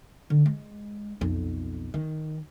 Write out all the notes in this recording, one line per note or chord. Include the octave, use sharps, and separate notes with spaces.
D3
G#3
B1 F2
D#3